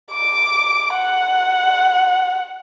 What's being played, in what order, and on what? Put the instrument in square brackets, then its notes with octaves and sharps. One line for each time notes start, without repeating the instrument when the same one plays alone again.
[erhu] D6
F#5